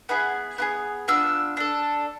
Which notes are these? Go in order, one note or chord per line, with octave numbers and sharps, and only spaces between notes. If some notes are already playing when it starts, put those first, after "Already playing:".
B3 E4 G#4
B3 E4 G#4
B3 D4 F4 E6
D4 A4